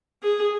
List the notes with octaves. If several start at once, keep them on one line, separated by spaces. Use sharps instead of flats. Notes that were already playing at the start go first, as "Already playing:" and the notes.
G#4